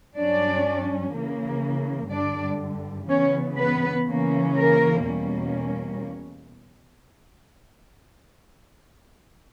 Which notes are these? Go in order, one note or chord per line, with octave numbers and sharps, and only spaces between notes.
G2 F#3 C#4 D4 D5
C#3 E3 A#3
G2 D3 G3 D4 D5
C#3 E3 B3 C#4 C#5
B3 B4
C#3 E3 A#3 C#4
A#3 A#4
E2 B2 G3 A#3 C#4